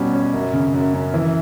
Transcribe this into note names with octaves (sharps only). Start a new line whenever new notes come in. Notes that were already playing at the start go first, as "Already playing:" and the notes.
Already playing: B2 G3 C#4
C#4
F#2
C#3
F#2
F#2
E3